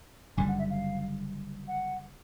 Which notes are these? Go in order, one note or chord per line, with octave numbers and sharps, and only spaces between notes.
F#1 F#2 D3 G3 G#5
F#5
E5
F5
F#5